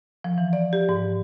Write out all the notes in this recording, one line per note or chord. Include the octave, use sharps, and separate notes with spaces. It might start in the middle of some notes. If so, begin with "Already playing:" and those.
F3
E3
D5
G4
G#2